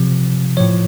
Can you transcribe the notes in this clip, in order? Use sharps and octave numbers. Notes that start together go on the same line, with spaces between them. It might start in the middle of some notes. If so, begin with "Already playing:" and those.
Already playing: C3 F3
A2 F3 C#5